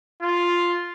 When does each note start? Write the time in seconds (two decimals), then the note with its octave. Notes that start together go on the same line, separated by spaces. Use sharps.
0.23 F4